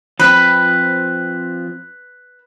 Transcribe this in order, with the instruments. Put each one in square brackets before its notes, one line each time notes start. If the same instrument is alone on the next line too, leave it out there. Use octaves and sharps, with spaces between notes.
[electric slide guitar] F3 C4 [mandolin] B4